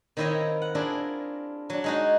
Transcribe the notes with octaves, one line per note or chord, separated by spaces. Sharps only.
D#3 C4 E4 C#5 D#5 F5
F#5
D4 E4 F4 G#4 A#4
F#3 D4
G#3 D#4 F#4